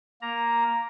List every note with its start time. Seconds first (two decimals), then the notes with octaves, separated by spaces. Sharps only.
0.22 A#3 A#5